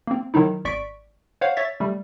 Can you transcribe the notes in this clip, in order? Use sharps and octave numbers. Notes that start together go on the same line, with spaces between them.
A#3 C4
D#3 F#3 D#4 E4
G#1 D5 C#6 B6 D7
C5 C#5 F5 F#5
C#5 E5 A6 B6
G3 A3